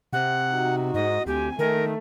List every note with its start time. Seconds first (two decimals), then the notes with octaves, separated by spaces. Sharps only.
0.13 C3 F#5
0.52 D#4 F#4
0.94 G#2 D#5
1.26 D2 C4 G4 G#5
1.59 D#3 A3 A#4